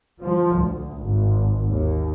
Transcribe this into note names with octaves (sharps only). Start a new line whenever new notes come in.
F3
D2
G#1
D#2